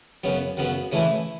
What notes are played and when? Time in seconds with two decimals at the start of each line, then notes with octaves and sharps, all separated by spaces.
0.24 F#2 C#3 F#3 B3
0.57 F#2 C#3 F#3 B3
0.92 C#3 E3 A3 E4